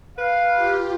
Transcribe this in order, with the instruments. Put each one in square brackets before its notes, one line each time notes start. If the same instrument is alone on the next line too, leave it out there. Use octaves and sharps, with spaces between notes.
[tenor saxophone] B4 [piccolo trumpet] F5
[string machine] F4 G4